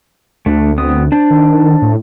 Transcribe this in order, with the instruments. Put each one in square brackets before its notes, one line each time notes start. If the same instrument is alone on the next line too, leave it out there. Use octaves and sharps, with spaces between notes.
[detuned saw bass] D2 [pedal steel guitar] A3 D4
[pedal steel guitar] B3 C4 D#6
D4 C5 D5
[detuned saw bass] D#3
A2